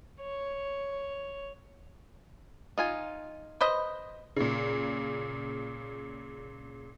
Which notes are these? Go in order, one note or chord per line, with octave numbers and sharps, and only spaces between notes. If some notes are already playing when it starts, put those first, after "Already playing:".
C#5
D#4 F4 G#5
B4 C5 D#5
A#2 C#3